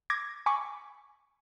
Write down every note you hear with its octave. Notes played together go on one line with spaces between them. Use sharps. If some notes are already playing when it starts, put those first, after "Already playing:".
D6 G#6 A#6
G#5 B5 C#6 D6